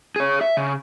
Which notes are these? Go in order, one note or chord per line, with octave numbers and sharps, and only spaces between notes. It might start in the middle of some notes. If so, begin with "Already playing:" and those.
G#4 C#5
E5
C#3